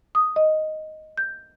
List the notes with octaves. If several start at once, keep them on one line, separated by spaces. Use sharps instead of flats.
D#6
D#5
G6